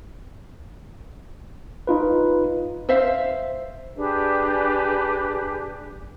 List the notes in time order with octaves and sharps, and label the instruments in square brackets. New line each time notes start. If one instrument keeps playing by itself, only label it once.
[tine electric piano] D#4 F4 B4
[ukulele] C5 E5 F5
[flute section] D4 G4 G#4 B4